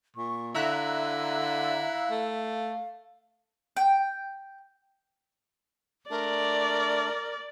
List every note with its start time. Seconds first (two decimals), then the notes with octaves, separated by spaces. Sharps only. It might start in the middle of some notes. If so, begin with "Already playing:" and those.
0.16 A#2 C#6
0.55 D3 E4 E5 F5 A#5 F#6
2.10 A3
3.76 G5
6.10 A3 D4 A#4 D5